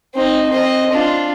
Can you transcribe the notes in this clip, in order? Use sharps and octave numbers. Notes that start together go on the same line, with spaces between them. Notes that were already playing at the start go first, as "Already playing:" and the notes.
C4 D#4
C4 D#5
D4 F4